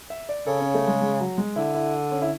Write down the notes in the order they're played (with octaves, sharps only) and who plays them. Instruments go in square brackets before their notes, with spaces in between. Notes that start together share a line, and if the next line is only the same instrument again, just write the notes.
[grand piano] E5
D5
[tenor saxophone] C#3 [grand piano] A4
[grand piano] C#4
A3
G#3
G#3
F#3
G#3
[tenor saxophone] D3 [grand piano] E4
[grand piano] E4
C#4
E4